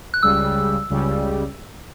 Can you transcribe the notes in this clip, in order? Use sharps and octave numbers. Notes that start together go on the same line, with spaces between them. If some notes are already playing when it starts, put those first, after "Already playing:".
F#6
C#2 C#3 G3 E6
C#2 C#3 G3